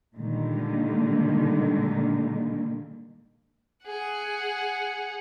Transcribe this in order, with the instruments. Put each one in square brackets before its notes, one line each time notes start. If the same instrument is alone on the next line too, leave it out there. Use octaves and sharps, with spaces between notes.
[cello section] A#2 D3 D#3 G3 G#3 A#3
[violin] G#4 F#5